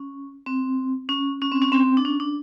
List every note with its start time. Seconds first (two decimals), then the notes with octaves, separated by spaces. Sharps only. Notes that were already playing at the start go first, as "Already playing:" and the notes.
Already playing: C#4
0.46 C4
1.09 C#4
1.42 C#4
1.52 C4
1.62 C#4
1.72 C4
1.97 D4
2.05 C#4
2.20 D4